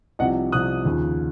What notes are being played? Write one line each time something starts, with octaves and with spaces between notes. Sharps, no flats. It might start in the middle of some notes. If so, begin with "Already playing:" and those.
C2 C3 F3 D#5 F#5
C2 C3 F3 D#6 F#6
D#2 C#3 F3